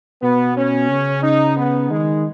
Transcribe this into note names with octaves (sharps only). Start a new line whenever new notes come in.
B2 B3
C#4
C#3
D#4
B3
D#3 G#3